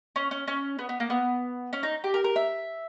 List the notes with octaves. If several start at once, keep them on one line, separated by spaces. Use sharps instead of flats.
C#4
C#4
C#4
B3
B3
A#3
B3
C#4
D#4
G4
A#4
A#4
E5